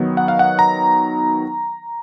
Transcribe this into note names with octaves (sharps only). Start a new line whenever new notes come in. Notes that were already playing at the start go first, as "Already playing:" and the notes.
Already playing: D#3 F#3 B3 D#4
F#5
F5
F#5
A#5